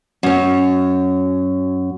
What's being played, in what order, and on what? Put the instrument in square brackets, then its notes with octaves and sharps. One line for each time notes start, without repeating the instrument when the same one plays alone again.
[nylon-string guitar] F#2 C#4